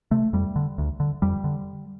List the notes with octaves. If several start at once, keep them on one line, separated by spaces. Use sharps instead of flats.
C3 A3
F2 G3
D3
D2
D3
F2 G3
D3